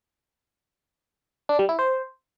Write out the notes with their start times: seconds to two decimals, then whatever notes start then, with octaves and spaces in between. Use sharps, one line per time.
1.49 D4
1.59 G3
1.69 E4
1.79 C5